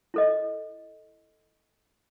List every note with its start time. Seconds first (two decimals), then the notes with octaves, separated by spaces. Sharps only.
0.14 E4 A4 D#5